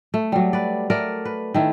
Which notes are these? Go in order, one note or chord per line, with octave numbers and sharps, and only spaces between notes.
A3
F#3 G3
B4 D5
A3 A#4 D5
B4
D#3 A3 E4